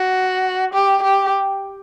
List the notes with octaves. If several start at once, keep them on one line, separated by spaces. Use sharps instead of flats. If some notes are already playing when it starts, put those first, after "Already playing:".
Already playing: F#4
G4
G4